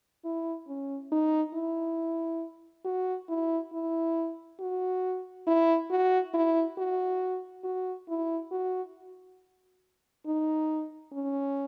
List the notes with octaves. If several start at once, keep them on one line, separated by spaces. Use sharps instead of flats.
E4
C#4
D#4
E4
F#4
E4
E4
F#4
E4
F#4
E4
F#4
F#4
E4
F#4
D#4
C#4